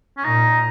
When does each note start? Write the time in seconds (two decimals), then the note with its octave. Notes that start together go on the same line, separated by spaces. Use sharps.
0.17 C#4
0.24 A#2 D#4